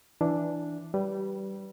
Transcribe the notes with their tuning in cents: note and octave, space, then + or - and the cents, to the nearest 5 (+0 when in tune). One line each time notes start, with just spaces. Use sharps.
E3 +0 D4 +0
G3 -15 B4 -5